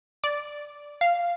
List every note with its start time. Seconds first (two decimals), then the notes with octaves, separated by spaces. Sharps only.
0.24 D5
1.01 F5